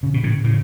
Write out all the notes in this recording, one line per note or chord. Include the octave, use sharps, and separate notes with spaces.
C#3
B2
A2 C#3
A2 C#3